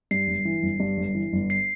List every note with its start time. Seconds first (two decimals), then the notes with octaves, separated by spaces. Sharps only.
0.11 G2 C7
0.27 G1
0.45 E3
0.62 G1
0.80 G2
0.97 G1
1.15 E3
1.32 G1
1.50 C7